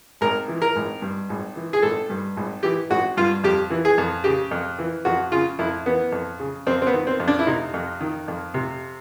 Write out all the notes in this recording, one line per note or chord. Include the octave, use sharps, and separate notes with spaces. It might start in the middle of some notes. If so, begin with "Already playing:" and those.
G#1 A#4
E3
A#4
G#1
G2
G#1
E3
G#4
G#1 A4
G2
G#1
E3 G4
G#1 F#4
G2 F4
F2 G4
E3
G#4
F2
C#3 G4
F2
E3
F2 F#4
C#3 F4
F2 E4
E3 B3
F2
C#3
F2 C4
C4
B3
D#3
C4
F2
D4
E4
C3 D#4
F2
D#3
F2
C3